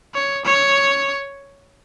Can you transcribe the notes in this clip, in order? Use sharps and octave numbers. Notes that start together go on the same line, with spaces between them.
C#5
C#5